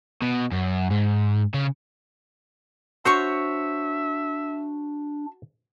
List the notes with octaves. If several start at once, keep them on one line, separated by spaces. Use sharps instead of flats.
B2
F#2
G#2
C#3
D4 F#4 C5 C#5 E5 C#6